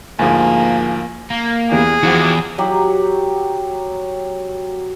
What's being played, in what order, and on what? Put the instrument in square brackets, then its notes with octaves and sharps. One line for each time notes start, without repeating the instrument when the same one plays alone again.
[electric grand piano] D2 G#2 F3 [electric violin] A#3 [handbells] G#4 G#5
[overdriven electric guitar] A#3
[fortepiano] E2 B3 G4 [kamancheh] G#4
[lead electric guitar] E2 [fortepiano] E3 F3 F#5 [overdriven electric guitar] F#4 G4
[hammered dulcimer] F#3 G4 F#5